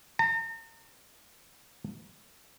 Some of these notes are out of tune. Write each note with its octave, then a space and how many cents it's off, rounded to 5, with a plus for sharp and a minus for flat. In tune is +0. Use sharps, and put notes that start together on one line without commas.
A#5 -40